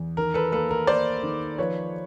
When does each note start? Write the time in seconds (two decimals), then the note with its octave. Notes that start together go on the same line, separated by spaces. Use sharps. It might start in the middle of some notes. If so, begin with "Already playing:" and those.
Already playing: E2
0.17 D#3 A#4
0.34 A4 B4
0.52 A#3 A4 B4
0.71 A#4
0.87 A#3 C5 D5
1.23 D#3
1.58 F3 B4 C#5